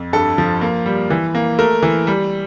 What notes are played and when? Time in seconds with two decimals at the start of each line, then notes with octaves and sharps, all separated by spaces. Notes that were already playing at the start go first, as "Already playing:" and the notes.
Already playing: F2
0.13 G2 A4
0.38 F3
0.61 A#3
0.86 G3
1.10 E3
1.35 A#3
1.59 A3 A#4
1.83 E3
2.07 G3